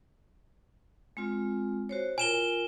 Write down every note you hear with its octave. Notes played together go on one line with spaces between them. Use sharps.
G#3 C4 F4
F#4 C5 C#5
F4 A#4 G#5 E7 G7